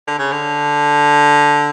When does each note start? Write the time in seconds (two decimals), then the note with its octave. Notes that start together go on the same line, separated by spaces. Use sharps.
0.08 D3
0.19 C#3
0.32 D3